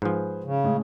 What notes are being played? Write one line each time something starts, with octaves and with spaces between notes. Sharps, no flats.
G#2 F3 G#4 B4 C5
C#3
A2 G#3 C#4